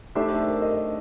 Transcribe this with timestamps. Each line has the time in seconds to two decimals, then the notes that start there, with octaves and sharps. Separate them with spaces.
0.15 A3 D4 D#4 G4 C5 E5
0.31 A4
0.47 A#4
0.62 D#5